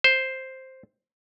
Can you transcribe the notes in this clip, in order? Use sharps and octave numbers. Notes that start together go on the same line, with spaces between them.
C5